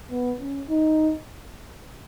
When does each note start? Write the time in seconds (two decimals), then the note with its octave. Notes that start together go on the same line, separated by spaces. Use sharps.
0.10 B3
0.40 C#4
0.69 D#4